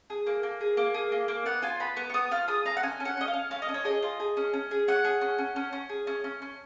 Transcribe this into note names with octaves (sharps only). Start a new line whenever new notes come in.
G#4
A#3
A#3
G#4
A#3
G#4
A#3
A#3
B3 F#5
F4 G#5
B3 B5
B3
C#6
B3 D#6
F4 F6
G#4 D#6
F4 A#5
F#5
C#4 G#5
C#4
F#5
C#4 D#5
F5
C#4
C#4 F5
D#5
C#4
C#5
G#4 D#5
F4
G#4
C#4
C#4
G#4
C#4 F#5
G#4
C#4
C#4
C#4
C#4
G#4
C#4
C#4
C#4